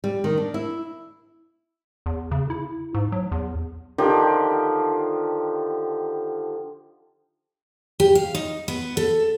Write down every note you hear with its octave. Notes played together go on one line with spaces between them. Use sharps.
G3
D#3
D4
E4
E2
C#3
E4
G#2
F#3
E2
D3 D#3 F3 G4
G4
F5
D#4
B3
A4